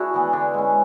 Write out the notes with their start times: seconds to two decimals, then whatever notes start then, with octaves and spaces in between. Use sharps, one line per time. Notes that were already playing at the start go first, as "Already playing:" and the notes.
Already playing: D4 E4 F#4 G#4
0.14 E3 B3
0.33 D3 D4
0.54 G#3 C#4